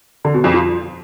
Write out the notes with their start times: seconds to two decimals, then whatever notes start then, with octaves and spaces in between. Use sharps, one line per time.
0.25 D3
0.34 B2
0.44 F2
0.54 F3